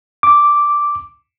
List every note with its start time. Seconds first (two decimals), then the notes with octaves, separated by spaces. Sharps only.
0.23 D6